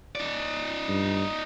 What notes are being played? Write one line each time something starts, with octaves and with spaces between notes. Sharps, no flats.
D#4 D5
G2